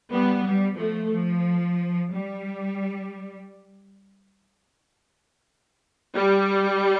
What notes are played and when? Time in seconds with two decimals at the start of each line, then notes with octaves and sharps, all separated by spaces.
0.11 G3 B3
0.44 G3
0.77 F3 A3
1.11 F3
2.13 G3
6.15 G3